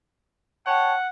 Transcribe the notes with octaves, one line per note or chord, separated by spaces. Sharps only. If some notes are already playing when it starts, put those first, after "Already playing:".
C#5 F#5 G5 A5